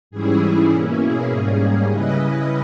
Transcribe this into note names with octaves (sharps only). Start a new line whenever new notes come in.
G#2 E3 G3 C#4 E4 G#4
B2 A#3 C#4 E4
G#4
G#2 G3 A#3 C#4
C#3 G3 C#4 E4 B4 D#5